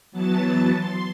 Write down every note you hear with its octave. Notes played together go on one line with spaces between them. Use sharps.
E3 F#3 B3 A5 A6
C6